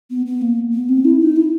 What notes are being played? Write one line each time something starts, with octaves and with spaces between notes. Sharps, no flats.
B3
B3
A#3
B3
C4
E4
D#4
E4